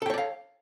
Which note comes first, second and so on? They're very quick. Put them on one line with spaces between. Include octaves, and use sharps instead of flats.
A4 G5 C#5 D5 F5